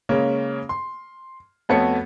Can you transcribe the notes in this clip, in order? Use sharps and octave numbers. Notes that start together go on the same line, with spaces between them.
C#3 G#3 A#3 C#4
C6
F2 A3 B3 F#4 C#5 C#7